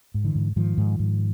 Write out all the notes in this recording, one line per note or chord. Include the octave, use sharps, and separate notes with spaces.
G#2
D3 E3
G#2
G#2 D#3 F3
G#2
G#2